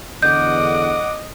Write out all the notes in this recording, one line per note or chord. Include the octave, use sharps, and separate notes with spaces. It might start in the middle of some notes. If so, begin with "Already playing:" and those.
E2 D3 D#5 F#5 D6 G6